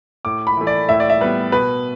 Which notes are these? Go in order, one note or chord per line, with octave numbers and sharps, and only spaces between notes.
A2 D6
B5
E3 A3
D5
A2 E5
D5
E5
G3 B3 B4
B2 B4